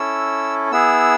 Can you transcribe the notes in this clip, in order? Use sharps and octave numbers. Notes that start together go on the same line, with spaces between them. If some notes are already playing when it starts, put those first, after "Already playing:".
Already playing: C#4 E4 A4 E6
B3 E4 G#4 E6